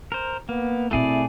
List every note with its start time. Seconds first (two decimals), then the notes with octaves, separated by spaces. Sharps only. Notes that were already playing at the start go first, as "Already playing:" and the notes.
0.12 A#4 C5
0.49 A#3 B3
0.91 B2 A3 C4 E4 G#4 D5